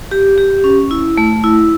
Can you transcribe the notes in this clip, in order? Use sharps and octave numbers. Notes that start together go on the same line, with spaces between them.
G4
G4
C#4
E4
A3
E4